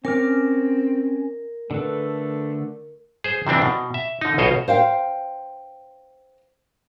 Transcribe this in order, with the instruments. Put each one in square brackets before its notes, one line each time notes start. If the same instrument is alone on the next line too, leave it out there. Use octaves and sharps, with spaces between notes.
[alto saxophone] C4 [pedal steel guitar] C#4 D6 F6 [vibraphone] A#4
[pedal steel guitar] D3 A4 B4 [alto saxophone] A3
[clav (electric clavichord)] G#4 C5
C3 E3 C4 D4
B2
E5
D3 D#4
B1 B2 F4 C5 C#5 D#5
[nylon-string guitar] C5 F5 G5